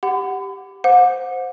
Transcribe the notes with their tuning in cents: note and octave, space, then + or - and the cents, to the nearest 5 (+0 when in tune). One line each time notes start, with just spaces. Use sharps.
G4 +0 F#5 +5 B5 +40
C5 +0 F#5 -35 D6 +0